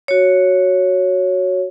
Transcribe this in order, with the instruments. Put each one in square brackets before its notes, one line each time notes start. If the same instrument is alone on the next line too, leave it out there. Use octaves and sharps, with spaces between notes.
[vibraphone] F#4 C#5